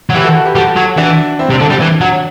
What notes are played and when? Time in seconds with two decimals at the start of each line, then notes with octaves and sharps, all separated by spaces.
0.10 F#3
0.14 E3 G4 B4
0.24 F#4 A4
0.35 F#4 A4
0.45 G4 B4
0.55 G3 F#4 A4
0.76 F#3
0.97 E3 D4 F#4
1.39 C4 E4
1.50 C3
1.53 D4
1.60 D3
1.67 G3 C4 E4
1.81 E3 D4
2.01 F#3